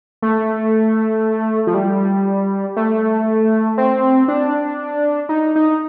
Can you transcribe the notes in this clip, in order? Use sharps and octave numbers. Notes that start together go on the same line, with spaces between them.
A3
F3
G3
A3
C4
D4
D#4
D#4